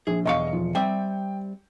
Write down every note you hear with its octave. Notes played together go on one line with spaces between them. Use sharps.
A#1 G#4
B1 E2 D#5 F5 C#6 C#7
F3
G3 C4 E5 G5